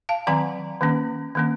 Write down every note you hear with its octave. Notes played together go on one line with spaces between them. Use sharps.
F5 A5
D#3 F#3 C4 F#5 A#5
D#3 A#3 C#4
D#3 A#3 C#4